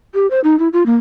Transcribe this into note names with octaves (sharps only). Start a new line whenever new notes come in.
G4
C5
D#4
E4
F4
A#3